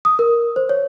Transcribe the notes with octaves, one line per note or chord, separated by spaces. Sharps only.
D#6
A#4
C5
C#5